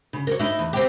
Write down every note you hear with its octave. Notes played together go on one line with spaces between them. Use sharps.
C#3
A#4 C#5
D#4 E4
E2
C4 G4